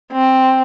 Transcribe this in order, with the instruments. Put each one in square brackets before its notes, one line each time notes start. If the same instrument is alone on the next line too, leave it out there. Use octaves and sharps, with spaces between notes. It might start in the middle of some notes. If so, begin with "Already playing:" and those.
[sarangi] C4